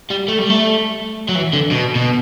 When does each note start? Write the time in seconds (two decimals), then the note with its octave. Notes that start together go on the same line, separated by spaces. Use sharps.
0.11 G3
0.28 A3
0.39 G3
0.50 A3
1.29 F#3
1.35 E3
1.53 D3
1.71 B2
1.95 B2